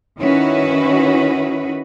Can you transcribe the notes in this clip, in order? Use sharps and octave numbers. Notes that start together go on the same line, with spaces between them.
D#3 C#4 E4 F#4 B4